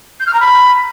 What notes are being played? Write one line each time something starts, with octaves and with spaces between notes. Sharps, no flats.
G6
F6
A#5
B5